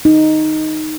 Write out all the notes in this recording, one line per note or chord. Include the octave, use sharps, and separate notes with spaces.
D#4